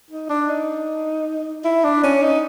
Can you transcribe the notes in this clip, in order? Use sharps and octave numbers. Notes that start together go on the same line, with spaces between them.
D#4
D4
D#4
E4
D4
C#4
D#4